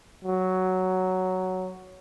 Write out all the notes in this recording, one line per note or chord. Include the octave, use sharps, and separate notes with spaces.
F#3